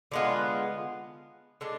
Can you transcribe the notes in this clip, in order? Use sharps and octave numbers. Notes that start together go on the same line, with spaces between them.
D3 G#3 B3 F4
D3 G#3 D4